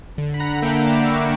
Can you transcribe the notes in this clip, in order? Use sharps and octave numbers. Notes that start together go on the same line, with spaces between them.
D3
B5
F#5 A#5
A#3 D4 E5 G5
E6
B5 D6
D3 C#6 E6